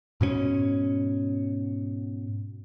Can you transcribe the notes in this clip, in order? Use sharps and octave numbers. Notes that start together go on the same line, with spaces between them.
G#2 B2 B3 C#4